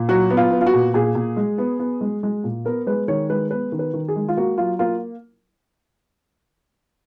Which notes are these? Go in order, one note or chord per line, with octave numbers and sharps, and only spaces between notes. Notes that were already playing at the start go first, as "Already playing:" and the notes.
Already playing: A#2
F#3 F#4
B3
F4
B3
F4
F#4
A#2
A#2 G#4
A#2
G#3
B3
B3
G#3
G#3
A#2
B3 A#4
G#3 B4
D#3 C#5
G#3 B4
B3 B4
D#3
B4
D#3
G#4
G#3
F4
A#3 F#4
F#3 F4
A#3 F4